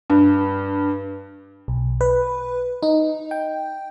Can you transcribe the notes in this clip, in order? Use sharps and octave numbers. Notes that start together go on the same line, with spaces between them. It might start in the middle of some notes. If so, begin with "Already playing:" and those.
G2
B1
B4
D#4
G5